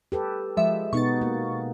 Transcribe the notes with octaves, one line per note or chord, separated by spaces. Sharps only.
G4 A4 B4
F3 G#3 E5
B2 B3 D#4 C#6 A6
A#3